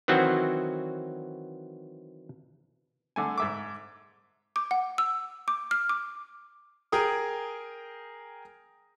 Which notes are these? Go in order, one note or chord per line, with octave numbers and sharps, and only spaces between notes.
D#3 E3 F#3 C4 F#4
D3 A3 G#5
G#2 E5 D6
D6
F#5
E6
D6
F6
D6
G#4 A#4 G5 D#6